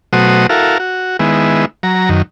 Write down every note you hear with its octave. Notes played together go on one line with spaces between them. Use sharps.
B2 F#3 A3 F#4 C5 D#6
E4 F#4 A4 A#4 F5
F#4
D#3 G#3 B3 E4
F#3 A#5
F#2 D#3